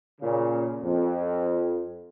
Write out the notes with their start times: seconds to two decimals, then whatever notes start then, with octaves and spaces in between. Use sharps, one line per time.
0.21 A#2 C#3
0.81 F2